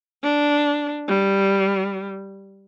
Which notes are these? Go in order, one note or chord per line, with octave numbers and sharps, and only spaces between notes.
D4
G3